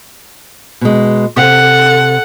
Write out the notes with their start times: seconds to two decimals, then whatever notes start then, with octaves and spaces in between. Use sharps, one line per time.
0.81 B2 G#3
1.36 C3 A4 F5 F#5